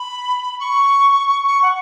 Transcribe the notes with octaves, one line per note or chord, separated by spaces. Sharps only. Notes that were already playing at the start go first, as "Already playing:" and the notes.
Already playing: B5
C#6
C#6
F#5